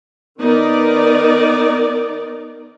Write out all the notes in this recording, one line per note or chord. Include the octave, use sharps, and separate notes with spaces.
D#3 B3 D#4 A#4 D5